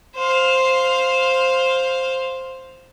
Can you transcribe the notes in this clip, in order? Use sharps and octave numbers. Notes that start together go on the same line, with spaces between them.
C5 F5